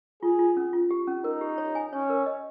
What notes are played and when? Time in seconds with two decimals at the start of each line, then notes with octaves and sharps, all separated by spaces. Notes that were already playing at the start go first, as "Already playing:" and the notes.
0.23 F4 G#4
0.39 F4
0.57 C#4
0.73 F4
0.91 G4
1.07 C#4
1.24 D#4 A#4
1.41 G4
1.58 C#5
1.75 G#5
1.93 C#4 C#5
2.10 A#4
2.26 D#5